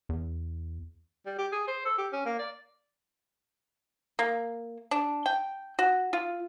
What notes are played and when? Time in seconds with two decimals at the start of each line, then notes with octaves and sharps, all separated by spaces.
0.09 E2
1.26 G3
1.38 G4
1.52 G#4
1.67 C5
1.85 A4
1.98 G4
2.13 C#4
2.26 A#3
2.39 D5
4.19 A#3
4.91 D4
5.26 G5
5.79 F#4
6.13 F4